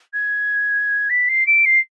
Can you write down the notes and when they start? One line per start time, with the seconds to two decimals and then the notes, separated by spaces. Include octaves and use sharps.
0.13 G#6
1.09 B6
1.28 C7
1.46 D7
1.65 C7